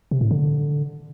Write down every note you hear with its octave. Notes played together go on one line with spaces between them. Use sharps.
C3
A2
D3